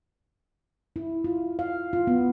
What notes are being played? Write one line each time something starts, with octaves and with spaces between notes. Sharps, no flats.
E4
F4
F5
F4
B3